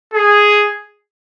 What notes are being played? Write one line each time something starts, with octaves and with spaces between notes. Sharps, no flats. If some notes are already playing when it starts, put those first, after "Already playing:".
G#4